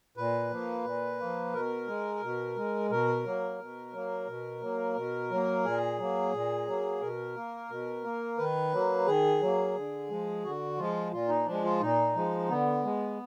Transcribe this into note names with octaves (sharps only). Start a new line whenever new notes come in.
A#2 B4
F3 A#3
A#2
F3 A#3
B2 A#4
G#3
B2
G#3
B2 A#4
F#3 A#3
B2
F#3 A#3
B2
F#3 A#3
B2
F#3 A#3
A#2 G#4
F#3 A#3
A#2
F#3 A#3
B2 A#4
A#3
B2
A#3
D#3 B4
F#3 A#3
D#3 G#4
F#3 A#3
D3
F3 G#3
D3 F#4
F3 G#3 F4
A#2 F4
D#4
F3 G#3 D4
F4
A#2 D#4
F3 G#3
D3 B3
G#3